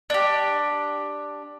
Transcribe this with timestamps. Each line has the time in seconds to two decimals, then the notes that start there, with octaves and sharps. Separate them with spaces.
0.10 D4 G4